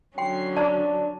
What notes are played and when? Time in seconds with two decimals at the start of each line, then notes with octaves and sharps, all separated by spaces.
0.18 D3 F#3 C#4 G5 C6 C7
0.57 D4 D5 A5 A#5